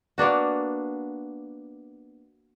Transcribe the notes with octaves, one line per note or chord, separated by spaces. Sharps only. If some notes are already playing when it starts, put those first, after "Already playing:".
A#3 B3 D4 F#4